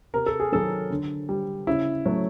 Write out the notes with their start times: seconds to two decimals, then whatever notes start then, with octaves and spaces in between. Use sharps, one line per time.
0.14 C3 A#4
0.26 A4
0.40 G#4
0.52 D#3 F#3 A4
0.90 D3
1.29 G3
1.67 C#3 E4
2.06 F#3 A3